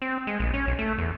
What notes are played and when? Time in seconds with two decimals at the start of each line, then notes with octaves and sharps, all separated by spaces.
0.02 C4
0.27 G#3
0.40 A#1
0.54 C#4
0.67 B1
0.79 A3
0.98 E2